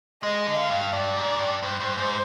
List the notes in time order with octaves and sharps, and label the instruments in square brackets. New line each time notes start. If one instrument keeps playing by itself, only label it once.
[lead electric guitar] G#3 [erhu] D#5
[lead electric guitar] D3
[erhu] F5
[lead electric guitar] G2
[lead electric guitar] G2 [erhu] D5
[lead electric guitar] G#2
G2
[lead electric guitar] G2 [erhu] C5
[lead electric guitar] G2
G#2